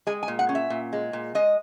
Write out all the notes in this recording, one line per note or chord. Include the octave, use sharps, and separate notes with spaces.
G#3 G#5
G#5
A#2
F#5
C#4
E5
A#2
G#3
A#2
G#3 D#5